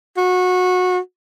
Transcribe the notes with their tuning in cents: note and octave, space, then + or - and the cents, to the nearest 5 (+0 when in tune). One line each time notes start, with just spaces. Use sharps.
F#4 -25